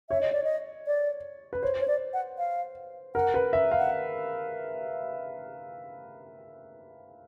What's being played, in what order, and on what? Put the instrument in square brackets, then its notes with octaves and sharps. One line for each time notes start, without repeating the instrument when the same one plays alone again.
[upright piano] C#5 [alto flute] E5
[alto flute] D#5
D5
D#5
D5
[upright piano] B4
[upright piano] C5 [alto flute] C#5
[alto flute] C#5
D5
F#5
F5
[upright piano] A#4 [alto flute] F#5
[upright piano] B4
E5
F5
[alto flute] F#5